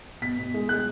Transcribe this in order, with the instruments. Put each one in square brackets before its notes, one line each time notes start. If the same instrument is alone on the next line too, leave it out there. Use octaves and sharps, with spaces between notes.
[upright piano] B2 B6
B2
G#3
G#3 F#6